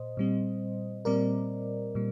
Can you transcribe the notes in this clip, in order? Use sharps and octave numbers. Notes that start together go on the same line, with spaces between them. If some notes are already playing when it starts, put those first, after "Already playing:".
Already playing: A#2 C5 D#5
A#2 G3 C4
A#2 G3 C4 A#4 D5
A#2 G3